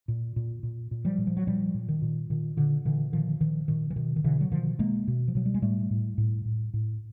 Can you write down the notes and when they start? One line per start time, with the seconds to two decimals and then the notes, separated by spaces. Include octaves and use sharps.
0.08 A#2
0.36 A#2
0.63 A#2
0.91 A#2
1.05 F3 G3
1.18 A#2
1.27 F3
1.37 F#3
1.47 A#2 F3 G3
1.74 A#2
1.89 D#3
2.02 A#2
2.30 A#2 D#3
2.57 A#2 D3
2.85 A#2 D3 E3
3.13 A#2 D#3 F3
3.40 A#2 D#3 F3
3.68 A#2 D#3
3.90 E3
3.96 B2 D#3
4.16 D#3
4.24 B2 D3 E3
4.41 F#3
4.52 B2 D#3 F3
4.79 B2 G#3 A#3
5.08 B2
5.28 F3
5.35 B2 F#3
5.46 G3
5.54 G#3
5.62 A2 G3 A3
5.91 A2
6.18 A2
6.45 A2
6.74 A2